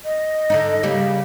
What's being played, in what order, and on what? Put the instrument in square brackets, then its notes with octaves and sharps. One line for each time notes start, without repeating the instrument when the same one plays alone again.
[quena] D#5
[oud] D3 D4 D#4
C#3 G3 A#3